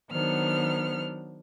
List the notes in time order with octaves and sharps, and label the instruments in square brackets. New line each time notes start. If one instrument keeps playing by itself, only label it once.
[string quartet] D#3 F#3 B3 D4 C5 F6